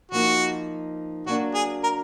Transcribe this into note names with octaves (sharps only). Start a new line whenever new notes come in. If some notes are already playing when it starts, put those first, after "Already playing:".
F3 A#3 D#4 F#4
F#3 A#3 D4 F#4
G#4
A#4